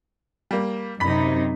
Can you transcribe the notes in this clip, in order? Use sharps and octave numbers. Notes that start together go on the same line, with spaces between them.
G3 A#3
F#2 C3 D#4 B5 B6